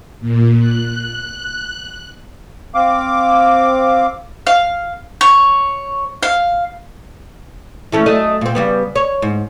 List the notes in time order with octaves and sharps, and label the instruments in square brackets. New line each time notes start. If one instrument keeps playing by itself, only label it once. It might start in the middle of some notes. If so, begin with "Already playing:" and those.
[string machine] A#2
F#6
[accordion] C4 F5 D6
[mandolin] F5
C#5
F5
[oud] E3 A3 C#4
F#2 A3 D#5
A#2 C4
C#3 G3 B3
C#5
G#2